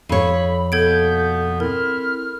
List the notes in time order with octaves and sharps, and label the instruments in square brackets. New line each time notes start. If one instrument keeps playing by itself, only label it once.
[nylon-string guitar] F2 C#5 [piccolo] B5
[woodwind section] B2 B3 [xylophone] A4 G#6 D7 [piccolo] G6
[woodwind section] C4 E4 [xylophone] A#4 [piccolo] F6